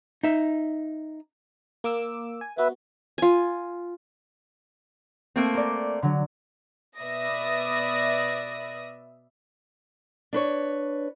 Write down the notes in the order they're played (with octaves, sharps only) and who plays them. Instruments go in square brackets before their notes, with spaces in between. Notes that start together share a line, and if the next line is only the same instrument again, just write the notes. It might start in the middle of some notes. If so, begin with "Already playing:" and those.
[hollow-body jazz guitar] D#4 E5
[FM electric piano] A#3 D6 E6
G#5
[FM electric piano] B3 F#4 [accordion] B4 E5
[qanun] F4 G#5
[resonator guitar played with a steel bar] A3 A#3 C4
[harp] A#4 D5
D3 F#3
[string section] B2 B4 D5 E5 D#6 A#6
[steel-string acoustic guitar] D4 B4 C#5